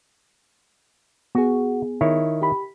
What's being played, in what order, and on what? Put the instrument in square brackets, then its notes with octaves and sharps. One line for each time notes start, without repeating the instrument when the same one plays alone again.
[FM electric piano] B3 G#4 [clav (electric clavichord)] F#4
[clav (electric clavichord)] D#3 E4 C#5
[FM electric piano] G4 B5